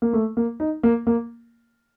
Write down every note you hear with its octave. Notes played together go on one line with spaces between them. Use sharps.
A#3
A3
A#3
D#4
A#3
A#3